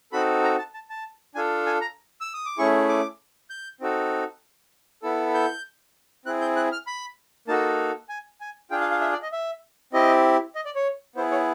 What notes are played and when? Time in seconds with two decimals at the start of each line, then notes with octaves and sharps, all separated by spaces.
0.12 C4 D#4 F#4 A4 B5
0.43 A#5
0.58 A5
0.74 A5
0.90 A5
1.35 D4 F4 A4 G#5
1.67 G#5
1.81 A#5
2.21 E6
2.34 D#6
2.46 D6
2.58 A3 C#4 E4 G#4 C#6
2.89 D6
3.50 G6
3.81 C4 D#4 F#4 A4
5.03 B3 E4 A4
5.34 G6
6.26 C4 E4 G#4 F#6
6.41 G6
6.56 F#6
6.72 F6
6.87 B5
7.48 A#3 D#4 F#4 A4 A5
8.09 G#5
8.41 G#5
8.71 D4 F4 G#4 G5
8.81 F5
8.91 F5
9.01 E5
9.12 D5
9.23 D#5
9.32 E5
9.93 C4 E4 G4 D#5
10.56 D#5
10.65 D5
10.75 C#5
11.16 B3 E4 G#4 C5
11.32 C#5